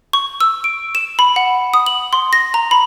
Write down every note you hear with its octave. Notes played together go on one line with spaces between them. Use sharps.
C#6
E6
D7
E7
B5
F#5
D#6
F#7
C6
A#6
A#5
B5